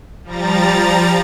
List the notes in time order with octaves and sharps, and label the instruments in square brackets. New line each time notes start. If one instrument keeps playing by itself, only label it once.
[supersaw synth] F3 G3 A#5 A6